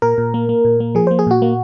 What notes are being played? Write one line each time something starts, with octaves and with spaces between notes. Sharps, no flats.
A#2 A#4
A#2
A#3
A#3
A#2
A#3
F3 G#4
A#3 C5
G#4
A#2 F#4
A#3